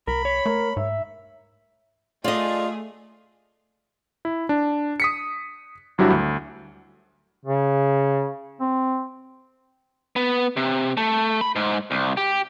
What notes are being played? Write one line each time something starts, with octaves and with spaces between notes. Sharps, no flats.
C2 A#4 B5
C#5 B6
A3 A#4
G#2 E5
A3 F4 G#4 D5 D#5
E4
D4
D#6 B6 C#7
G#1 F#3 G3 D4 E4 F#4
D2
C#3
C4
B3
C3
A3
B5
G#2
C2
G4